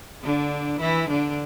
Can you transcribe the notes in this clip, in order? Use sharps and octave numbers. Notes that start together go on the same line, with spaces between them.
D3 D4
E3 E4
D3 D4